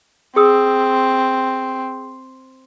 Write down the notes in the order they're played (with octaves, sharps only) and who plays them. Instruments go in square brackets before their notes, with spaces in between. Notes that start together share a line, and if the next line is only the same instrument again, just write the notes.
[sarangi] C4 [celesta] G#4 D#6 E6